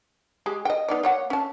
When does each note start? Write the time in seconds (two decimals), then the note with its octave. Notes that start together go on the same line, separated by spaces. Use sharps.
0.46 G#3 G4 G#4
0.65 D#5 G5
0.88 B3 D#4 D5
1.03 A#3 C#5 F#5
1.30 C#4 A5